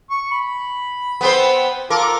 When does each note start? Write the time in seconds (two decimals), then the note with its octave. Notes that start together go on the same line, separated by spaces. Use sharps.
0.10 C#6
0.31 B5
1.21 B3 C4 C5
1.90 F4 A4 A#4 D6